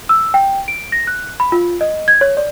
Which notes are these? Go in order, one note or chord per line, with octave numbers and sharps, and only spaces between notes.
E6
G5
D7
A#6
F#6
B5
F4
D#5
G#6
C#5
D5